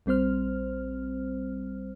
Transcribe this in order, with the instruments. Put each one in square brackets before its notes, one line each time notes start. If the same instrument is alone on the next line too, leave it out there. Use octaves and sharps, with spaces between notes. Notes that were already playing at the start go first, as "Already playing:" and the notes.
[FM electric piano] A#1 G3 C4 C5 F6